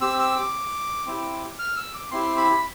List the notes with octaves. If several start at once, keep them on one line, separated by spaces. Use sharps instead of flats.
C4 G4 E6
E6
D6
C4 E4 G4
F6
E6
D6
C4 E4 G4 C6
B5